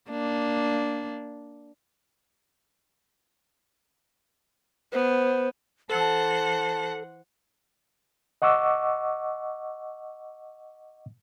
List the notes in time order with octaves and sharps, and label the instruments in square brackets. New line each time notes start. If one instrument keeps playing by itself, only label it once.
[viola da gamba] A#3 D4
[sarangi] B3 [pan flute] C5
[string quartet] E3 C5 F#5 [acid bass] A4 [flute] A5
[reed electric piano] D#5 F#5 C#6 D6 E6